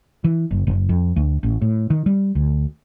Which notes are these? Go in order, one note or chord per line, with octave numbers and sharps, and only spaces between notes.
E3
F#1
F#1
F2
D2
A1
A2
D#3
G3
D2